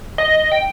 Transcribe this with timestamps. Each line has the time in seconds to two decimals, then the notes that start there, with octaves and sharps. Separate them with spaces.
0.18 D#5
0.52 G5